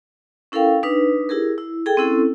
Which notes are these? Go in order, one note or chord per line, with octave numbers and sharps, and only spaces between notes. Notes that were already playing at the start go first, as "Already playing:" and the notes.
C#4 E4 A4 A#4 F5 G5
D4 D#4 B4
E4 G4 G#4 A#4
E4
G#4 A4 G5
C4 C#4 E4 A4